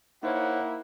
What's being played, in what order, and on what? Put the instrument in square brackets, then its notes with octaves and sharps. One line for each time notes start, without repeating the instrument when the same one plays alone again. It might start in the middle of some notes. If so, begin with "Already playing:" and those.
[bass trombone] A#3 [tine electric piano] D#4 C5 C#5 [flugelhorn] E4 [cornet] F#5